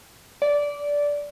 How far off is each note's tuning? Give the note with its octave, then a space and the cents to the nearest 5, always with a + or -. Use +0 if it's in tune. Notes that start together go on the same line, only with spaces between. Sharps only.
D5 -15